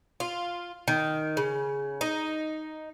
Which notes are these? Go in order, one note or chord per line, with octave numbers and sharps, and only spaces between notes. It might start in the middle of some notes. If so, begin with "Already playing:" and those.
F4
D#3
C#3
D#4